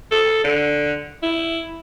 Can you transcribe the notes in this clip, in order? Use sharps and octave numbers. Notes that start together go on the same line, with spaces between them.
A4
D3
E4